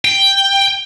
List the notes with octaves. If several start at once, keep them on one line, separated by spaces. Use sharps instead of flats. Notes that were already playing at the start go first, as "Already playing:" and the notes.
G5